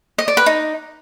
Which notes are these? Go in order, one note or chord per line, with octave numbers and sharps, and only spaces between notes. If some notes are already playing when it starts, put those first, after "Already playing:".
D#5
D5
B4
D#4